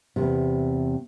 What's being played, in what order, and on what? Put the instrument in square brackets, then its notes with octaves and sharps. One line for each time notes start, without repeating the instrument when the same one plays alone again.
[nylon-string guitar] E2 G2 C3